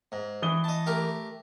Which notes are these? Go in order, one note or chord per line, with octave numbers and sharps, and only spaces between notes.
G#2
E3 D#6 G7
D#5 A5
A3 G4 A#4